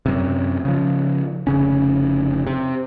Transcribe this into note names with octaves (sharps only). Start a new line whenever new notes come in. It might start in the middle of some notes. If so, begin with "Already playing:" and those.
F#2 C3
C#3 F3
F1 C#3 C#4
C3